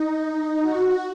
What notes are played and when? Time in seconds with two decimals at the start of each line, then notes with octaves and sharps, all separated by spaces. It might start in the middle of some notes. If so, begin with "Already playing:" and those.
Already playing: D#4
0.62 F#4